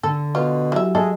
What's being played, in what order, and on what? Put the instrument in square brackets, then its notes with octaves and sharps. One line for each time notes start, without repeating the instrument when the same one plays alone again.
[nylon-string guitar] D3 [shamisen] A4
[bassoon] B2 [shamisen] F4
[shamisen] E3 E5 [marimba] F#3 F#4 G4
[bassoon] G#3 [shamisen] A4 [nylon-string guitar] E5